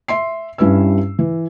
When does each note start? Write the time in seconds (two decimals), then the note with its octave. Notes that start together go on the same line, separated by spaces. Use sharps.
0.08 E5 C6 C7
0.58 G2 G3 C#4 E4 B4 E6
1.19 E3